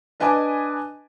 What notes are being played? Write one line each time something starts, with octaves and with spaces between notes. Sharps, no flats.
D4 B4 D#5 G#5 A5 D6